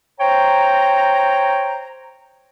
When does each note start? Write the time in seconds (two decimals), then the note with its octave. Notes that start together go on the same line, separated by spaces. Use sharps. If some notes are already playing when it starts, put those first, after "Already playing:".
0.20 C5 C#5 G5 A#5